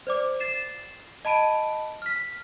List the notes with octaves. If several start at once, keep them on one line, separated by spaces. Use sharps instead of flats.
C5 D5 D6
A6 C7 E7
D#5 A5 B5 D7 D#7
F6 B6